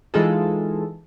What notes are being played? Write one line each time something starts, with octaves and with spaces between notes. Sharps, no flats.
E3 G#3 D#4 F4 G#4 A4